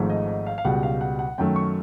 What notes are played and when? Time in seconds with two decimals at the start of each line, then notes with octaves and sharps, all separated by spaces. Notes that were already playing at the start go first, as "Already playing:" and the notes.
Already playing: G#1 G#2 F3 A3
0.10 D#5
0.28 D#5
0.46 F5
0.58 F5
0.65 C#2 B2 G3 F#5
0.83 F5
1.01 F#5
1.19 F#5
1.38 F#2 D#3 F#3 A3 G5
1.56 C#6